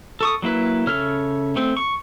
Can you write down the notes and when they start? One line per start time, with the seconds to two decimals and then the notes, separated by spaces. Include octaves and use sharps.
0.21 A4 C#6 D#6
0.42 F#3 A#3 E4 B4
0.87 C#3 A4 C#5 E5 F6
1.56 A3 C4
1.77 C#6